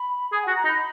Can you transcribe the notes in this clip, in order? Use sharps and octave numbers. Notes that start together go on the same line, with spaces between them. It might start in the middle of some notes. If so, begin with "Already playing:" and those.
Already playing: B5
G#4 G#5
F#4 F#5
A#5
D#4
B5